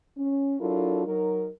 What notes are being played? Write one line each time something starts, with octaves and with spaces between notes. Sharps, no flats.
C#4
F#3 D4 E4 F4 A4 A#4
F#3 D#4 A#4